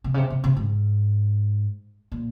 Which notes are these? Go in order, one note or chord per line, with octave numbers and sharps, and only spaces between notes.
C3
C#3
C3
C3
C3
G#2
A#2